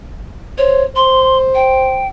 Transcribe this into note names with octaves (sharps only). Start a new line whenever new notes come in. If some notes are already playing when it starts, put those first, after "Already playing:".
C5 C#5
C5 C6
G5